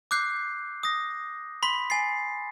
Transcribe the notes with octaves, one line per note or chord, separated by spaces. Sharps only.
D6 E6 F#6 G6 C7
D#6 A#6
B5 C6 B6
G#5 A6 C7